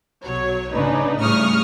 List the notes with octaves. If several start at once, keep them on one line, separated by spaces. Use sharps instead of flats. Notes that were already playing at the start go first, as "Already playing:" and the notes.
B1 F#3 C#5
C#3 D4 D#4 B4
A2 C#3 G3 C#6 D#6 F6